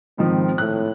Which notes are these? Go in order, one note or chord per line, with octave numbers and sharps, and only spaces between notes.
G#2 D#3 F3 C4
A2 F#6